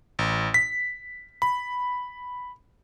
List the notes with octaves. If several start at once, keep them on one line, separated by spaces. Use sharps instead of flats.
A1
B6
B5